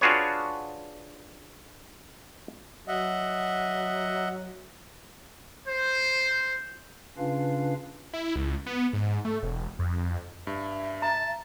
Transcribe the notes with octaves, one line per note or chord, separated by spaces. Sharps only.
D4 F4 F#4 G#4 B4 C#5
F#3 D#5 E5 F#5
C5
C#3 C#4 D4 F4 B4 F5
E4
C#2
B3
G#2
A3
E1
F2
G2 E5
A5 A#5